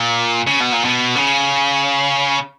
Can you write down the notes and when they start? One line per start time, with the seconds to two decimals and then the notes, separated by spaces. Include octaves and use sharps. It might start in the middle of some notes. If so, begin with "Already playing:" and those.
Already playing: A#2
0.47 C#3
0.60 B2
0.73 A#2
0.85 B2
1.16 C#3